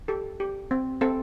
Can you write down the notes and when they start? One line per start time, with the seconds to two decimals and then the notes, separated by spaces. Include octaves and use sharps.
0.08 G4 A4
0.40 G4
0.71 C4
1.01 C4 A4